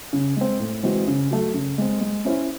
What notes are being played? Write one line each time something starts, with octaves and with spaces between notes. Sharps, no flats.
C#3
G#3 C4
A2
E3 G#3 C4 F#4
C#3
F#3 A3
C#3
G#3 C4
G#3
C#4 E4 C5